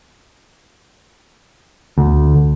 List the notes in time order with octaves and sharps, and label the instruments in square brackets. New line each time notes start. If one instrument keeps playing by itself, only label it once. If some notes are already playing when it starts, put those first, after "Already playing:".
[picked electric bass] D2